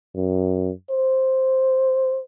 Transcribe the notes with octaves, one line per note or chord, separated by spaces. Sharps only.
F#2
C5